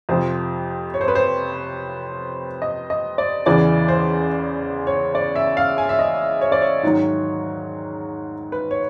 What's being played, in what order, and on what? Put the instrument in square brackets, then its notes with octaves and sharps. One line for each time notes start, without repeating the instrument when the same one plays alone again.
[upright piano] F2 C3 F3 C5
C#5
C5
B4
C5
D#5
D#5
D5
E2 C#3 E3 D5
C5
C#5
D5
E5
F5
G#5
E5
D#5
C#5
D5
C#5
G#2 D#3 F#3
B4
C#5